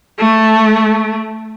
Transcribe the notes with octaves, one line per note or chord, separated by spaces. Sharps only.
A3